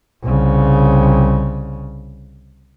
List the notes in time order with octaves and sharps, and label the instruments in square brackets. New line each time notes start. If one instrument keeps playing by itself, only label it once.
[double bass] C2 C#3